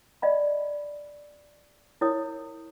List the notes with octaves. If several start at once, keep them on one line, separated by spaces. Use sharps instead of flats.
D5 D#5 F5 B5
E4 A#4 C#5 D#6